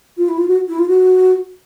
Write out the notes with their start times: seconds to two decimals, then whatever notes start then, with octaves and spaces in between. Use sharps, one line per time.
0.17 F4
0.28 E4
0.38 F4
0.48 F#4
0.68 E4
0.79 F4
0.88 F#4